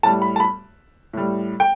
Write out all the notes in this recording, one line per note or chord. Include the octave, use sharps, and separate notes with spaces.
A2 G3 A5
B5
A5
B5
A2 G3
G5